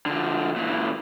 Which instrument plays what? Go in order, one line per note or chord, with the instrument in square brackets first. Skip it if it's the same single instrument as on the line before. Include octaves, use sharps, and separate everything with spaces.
[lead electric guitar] D3 F3
A#2 E3